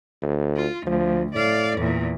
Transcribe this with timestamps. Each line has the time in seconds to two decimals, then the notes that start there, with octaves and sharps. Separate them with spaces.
0.22 D2
0.56 F4
0.87 D2 F3
1.35 A2 D5 F5
1.78 E2 A#2